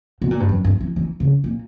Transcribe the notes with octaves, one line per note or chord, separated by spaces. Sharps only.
B2
A#2
G2
F#2
G2
E3
E3
C#3
A#2